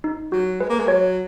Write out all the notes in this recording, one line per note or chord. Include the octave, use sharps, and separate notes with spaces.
D#4
F#3 F#4
G#3 B4
A#3
G#3
F#3 C#5